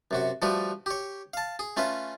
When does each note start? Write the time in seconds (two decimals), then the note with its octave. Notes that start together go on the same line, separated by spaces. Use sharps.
0.11 F#2 C3 F#4
0.42 F3 G3 A3 F#4 B4
0.86 G4 C#5
1.34 F5 A5
1.59 G#4
1.77 A3 C#4 F4 B4 E5